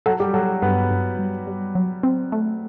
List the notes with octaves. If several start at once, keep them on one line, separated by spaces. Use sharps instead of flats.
F#3 F#4 A4
G3 G4
F#3 F#4 A4
G2 B3 B4
G2
G3
G3
F#3
C4
A3